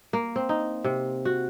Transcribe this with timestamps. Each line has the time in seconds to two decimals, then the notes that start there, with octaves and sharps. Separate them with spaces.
0.13 A#3
0.36 C4
0.49 D#4
0.84 C3
1.25 F#4